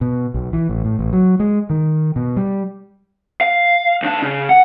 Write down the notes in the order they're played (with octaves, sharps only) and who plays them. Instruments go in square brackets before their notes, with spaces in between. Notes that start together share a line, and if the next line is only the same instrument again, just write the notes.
[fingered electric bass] B2
B1
E3
A1
A2
A1
F#3
G#3
D#3
B2
G3
[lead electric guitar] F5
D#2 D4
C#3
F#5